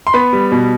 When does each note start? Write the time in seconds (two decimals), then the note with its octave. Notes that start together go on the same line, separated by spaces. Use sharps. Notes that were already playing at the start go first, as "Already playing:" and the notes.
0.07 C6
0.13 B3 B5
0.33 G3
0.52 B2